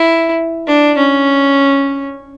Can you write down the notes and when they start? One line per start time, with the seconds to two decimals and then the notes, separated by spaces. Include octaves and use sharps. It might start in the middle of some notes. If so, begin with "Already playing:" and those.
Already playing: E4
0.67 D4
0.97 C#4